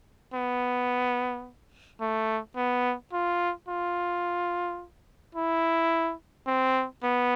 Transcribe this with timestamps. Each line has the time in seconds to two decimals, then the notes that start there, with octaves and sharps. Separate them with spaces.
0.33 B3
2.00 A3
2.56 B3
3.13 F4
3.68 F4
5.35 E4
6.47 C4
7.03 B3